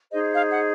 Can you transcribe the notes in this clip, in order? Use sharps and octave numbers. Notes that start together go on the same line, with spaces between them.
D#4 G#4 C5 D#5
F5
F#5